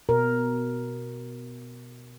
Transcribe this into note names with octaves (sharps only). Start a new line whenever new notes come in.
B2 A#4